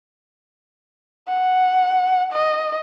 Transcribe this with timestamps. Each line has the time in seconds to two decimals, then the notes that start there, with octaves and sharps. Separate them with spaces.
1.28 F#5
2.32 D#5